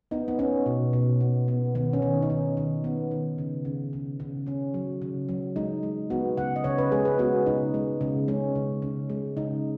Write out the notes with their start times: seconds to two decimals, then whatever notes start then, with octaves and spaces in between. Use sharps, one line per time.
0.11 B3 D#4
0.28 B3
0.39 B3 C#4
0.66 B2
0.93 B2
1.21 B3
1.48 B3
1.75 D#3 B3
1.93 C#4
2.02 D#3
2.22 D#4
2.30 D#3 C#4
2.57 D#3
2.84 B3
3.11 D#3
3.38 C#3
3.65 C#3
3.93 C#3
4.20 C#3
4.47 C#3 C#4
4.74 F#3
5.02 C#3
5.29 F#3
5.56 G#3 D#4
5.83 G#3
6.10 B3 F#4
6.37 C#3 F#5
6.56 D#5
6.64 C#3 C#5
6.78 B4
6.92 G#3 G#4
7.05 B4
7.19 B3 F#4
7.46 C#3 D#4
7.74 G#3
8.01 C#3
8.28 G#3 C#4
8.55 C#3
8.82 C#3
9.10 G#3
9.37 C#3 D#4